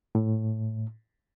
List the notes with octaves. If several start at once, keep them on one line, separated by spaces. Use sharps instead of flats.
A2